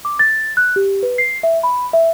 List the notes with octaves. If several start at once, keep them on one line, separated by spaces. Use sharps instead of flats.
D6
A6
F#6
G4
B4
C7
E5
B5
E5